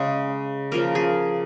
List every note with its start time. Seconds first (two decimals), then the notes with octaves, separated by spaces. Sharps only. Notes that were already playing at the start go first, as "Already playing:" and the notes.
Already playing: C#3 G#3 G#4
0.72 C#3 F3 A#3 A#4
0.95 G#4